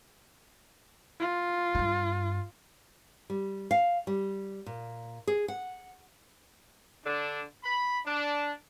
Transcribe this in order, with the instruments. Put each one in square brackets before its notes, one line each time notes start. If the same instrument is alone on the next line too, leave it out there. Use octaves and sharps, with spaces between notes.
[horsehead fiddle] F4
[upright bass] G2 D#4
[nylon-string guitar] G3
F5
G3
A#2
G#4
F#5
[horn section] D3 D4
B5
D4